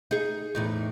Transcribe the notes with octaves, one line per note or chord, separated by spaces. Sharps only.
D#4 G#4
E2 A2 D#4